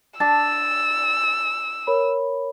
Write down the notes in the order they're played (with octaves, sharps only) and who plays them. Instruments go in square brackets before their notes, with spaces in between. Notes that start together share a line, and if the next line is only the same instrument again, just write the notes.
[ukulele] D4 A5 [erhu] E6 [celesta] A6
[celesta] A#4 C#5 B5